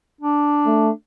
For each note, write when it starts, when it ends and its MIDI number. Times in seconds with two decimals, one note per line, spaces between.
0.21 0.90 62
0.66 0.90 57